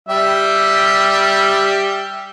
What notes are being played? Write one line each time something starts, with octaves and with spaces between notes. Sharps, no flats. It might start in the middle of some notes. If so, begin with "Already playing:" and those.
G3 G4 E5